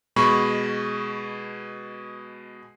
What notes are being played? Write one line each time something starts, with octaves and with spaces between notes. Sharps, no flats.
B2 G#3 B5 C#6